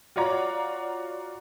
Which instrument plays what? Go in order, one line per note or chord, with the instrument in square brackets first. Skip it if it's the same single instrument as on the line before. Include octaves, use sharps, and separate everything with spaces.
[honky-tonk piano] F4 F#4 C#5 D5 A#5